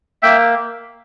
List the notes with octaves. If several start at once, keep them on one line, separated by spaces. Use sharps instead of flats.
A#3 E5 G5